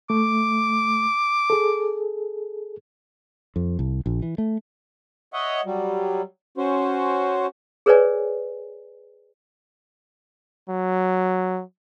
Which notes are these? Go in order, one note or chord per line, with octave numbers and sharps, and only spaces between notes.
A3 D6
G#4 A4
F2
C2
A#1
E3
A3
C#5 D#5 E5 F#5
F#3 G3
C#4 F#4 C5
G#4 A#4 B4 C#5 D5 G#5
F#3